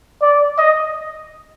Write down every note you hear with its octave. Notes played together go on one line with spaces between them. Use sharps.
D5
D#5